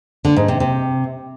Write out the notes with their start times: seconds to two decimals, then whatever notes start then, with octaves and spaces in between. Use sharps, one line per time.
0.25 D3
0.36 G#2
0.48 C3
0.60 C3